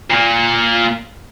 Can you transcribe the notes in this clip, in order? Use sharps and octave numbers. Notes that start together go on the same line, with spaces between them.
A#2 A#3